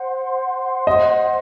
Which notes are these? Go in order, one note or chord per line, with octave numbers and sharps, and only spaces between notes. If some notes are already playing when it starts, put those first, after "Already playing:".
Already playing: C5 F#5 C6
D#5